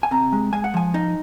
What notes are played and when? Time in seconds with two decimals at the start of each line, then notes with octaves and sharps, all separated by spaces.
0.03 G#5
0.11 C3 A#5
0.33 G#3
0.53 G#3 G#5
0.64 F#5
0.74 F3 G#5
0.94 D#4